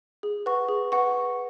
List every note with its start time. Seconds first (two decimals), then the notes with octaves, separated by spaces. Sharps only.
0.23 G#4
0.46 B4 F#5 C#6
0.69 G#4
0.92 B4 F#5 C#6